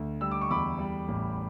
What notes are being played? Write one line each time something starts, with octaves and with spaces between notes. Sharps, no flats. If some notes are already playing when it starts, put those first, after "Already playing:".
Already playing: D2
G3 E6
D6
C#6
E2 B5 D6
G3
A1